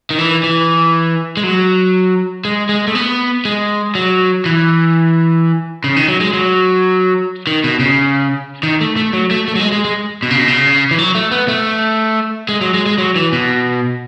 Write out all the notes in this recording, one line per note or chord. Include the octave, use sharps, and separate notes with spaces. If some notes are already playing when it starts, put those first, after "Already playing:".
D#3
E3
E3
G#3
F#3
G#3
G#3
A3
B3
G#3
F#3
E3
C#3
D#3
F#3
G#3
F#3
D#3
B2
C#3
D#3
A3
A3
F#3
A3
A3
F#3
G#3
G#3
G#3
B2
C#3
B2
C#3
E3
F#3
A3
B3
A3
G#3
F#3
G#3
G#3
F#3
E3
B2